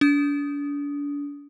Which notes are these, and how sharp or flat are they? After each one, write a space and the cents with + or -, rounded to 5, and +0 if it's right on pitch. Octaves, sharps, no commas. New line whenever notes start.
D4 -35 D#6 +0